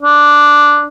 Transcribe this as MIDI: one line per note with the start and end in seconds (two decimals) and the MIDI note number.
0.02 0.86 62